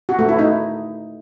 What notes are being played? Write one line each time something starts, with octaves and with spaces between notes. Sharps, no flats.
F#4
A3
E4
D#4